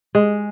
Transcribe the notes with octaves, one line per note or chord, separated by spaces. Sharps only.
G#3